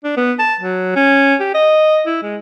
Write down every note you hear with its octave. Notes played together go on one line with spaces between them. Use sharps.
D4
B3
A5
F#3
C#4
G4
D#5
E4
G#3